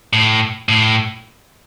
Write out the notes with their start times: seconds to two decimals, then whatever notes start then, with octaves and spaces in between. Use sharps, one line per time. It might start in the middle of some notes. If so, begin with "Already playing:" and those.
0.13 A2
0.69 A2